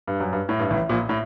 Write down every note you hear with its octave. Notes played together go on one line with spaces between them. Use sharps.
G2
F#2
G2
A2
G2
A1 A2
A#1 A#2
A2